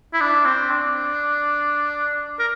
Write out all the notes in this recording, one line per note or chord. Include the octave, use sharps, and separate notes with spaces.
E4
D4
C4
D4
A#4